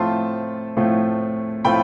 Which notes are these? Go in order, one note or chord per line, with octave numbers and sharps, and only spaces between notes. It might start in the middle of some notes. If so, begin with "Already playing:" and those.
Already playing: A2 F3 A3 C4 F4 A5 C6
A2 F3 A3 C4 F4
A2 F3 A3 C4 F4 G5 B5